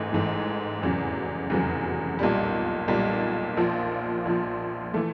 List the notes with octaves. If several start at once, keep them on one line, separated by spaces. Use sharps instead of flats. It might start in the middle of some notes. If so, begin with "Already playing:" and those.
Already playing: A1 G#2 E3 A3
A1 G#2 E3 A3
F1 E2 C#3 F#3
F1 E2 C#3 F#3
B1 A#2 G3
B1 A#2 G3
A#1 A#2 F3
A#1 A#2 F3
E3 A3